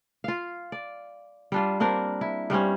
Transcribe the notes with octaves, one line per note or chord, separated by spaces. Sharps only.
F4 F5
D5
G3 D4 F4
A#3 C4 D4 A#4
E4
G2 G3 C4 C#4